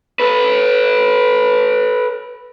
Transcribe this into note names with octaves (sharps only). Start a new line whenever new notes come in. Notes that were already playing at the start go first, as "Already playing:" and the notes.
A4 B4